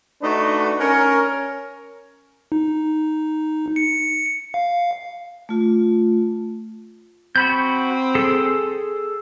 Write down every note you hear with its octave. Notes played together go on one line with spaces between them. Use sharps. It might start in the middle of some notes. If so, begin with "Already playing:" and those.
A3 D4 D#4 F#4 B4
C#4 A#4
D#4
C#7
F5
A3 F4
C4 F#4 B5 G6
G#4 A4